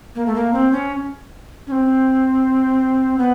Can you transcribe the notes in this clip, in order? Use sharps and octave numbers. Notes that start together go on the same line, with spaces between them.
A#3
A3
A#3
C4
C#4
C#4
C4
B3